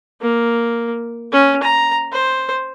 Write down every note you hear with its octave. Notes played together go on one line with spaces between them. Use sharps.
A#3
C#4
A#5
C5